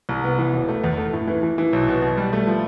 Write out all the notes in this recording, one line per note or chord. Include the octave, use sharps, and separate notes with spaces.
C2
B3
E3
E1
A3
E2
A3
A2
E3
E3
E3
B1
B2
B2
G3
A3
F3